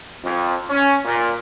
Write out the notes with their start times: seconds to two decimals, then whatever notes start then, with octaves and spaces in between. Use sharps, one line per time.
0.24 F2
0.69 C#4
1.05 A#2